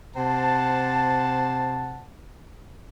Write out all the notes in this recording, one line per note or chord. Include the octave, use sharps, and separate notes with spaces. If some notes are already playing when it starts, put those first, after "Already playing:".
C3 C5 F#5 A5